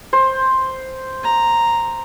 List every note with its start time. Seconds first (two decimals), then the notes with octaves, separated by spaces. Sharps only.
0.13 C5
1.23 A#5